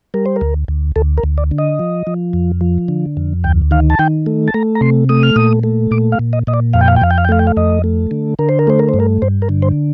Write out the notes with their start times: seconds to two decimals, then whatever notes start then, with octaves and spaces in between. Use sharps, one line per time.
0.14 G3 A#4
0.26 C5
0.36 A#4
0.41 D2
0.68 D2
0.96 D2 A4
1.18 A#4
1.23 D2
1.38 D5
1.51 D3
1.58 D#5
1.79 F3
2.07 F3
2.33 F2
2.61 F3
2.88 D3
3.17 F2
3.44 D2 G5
3.71 D#3 F5
3.90 A5
3.99 D#3 G5
4.26 A3
4.48 A5
4.54 A3 A#5
4.75 A#5
4.81 C3 C6
5.09 A3 D#6
5.23 F6
5.36 A#2 D#6
5.63 A3
5.91 A#2 D6
6.12 F5
6.19 A#2
6.33 D#5
6.47 A#2 D#5
6.54 D5
6.73 F2 F5
6.81 G5
6.88 F5
6.96 G5
7.02 F2 F5
7.11 G5
7.18 F5
7.25 G5
7.29 A3 F5
7.39 G5
7.47 F5
7.57 F2 D#5
7.84 A3
8.11 D3
8.39 D3 A#4
8.49 C5
8.59 A#4
8.67 A3 C5
8.79 A#4
8.89 C5
8.94 G2
9.00 A#4
9.22 G2 C5
9.42 A#4
9.49 D3
9.62 C5